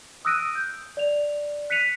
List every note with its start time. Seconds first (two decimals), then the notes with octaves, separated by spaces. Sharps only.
0.25 D#6 E6 F#6 A#6 D7 D#7
0.55 G6
0.97 D5 F7
1.70 F#6 B6 C#7 D#7 F7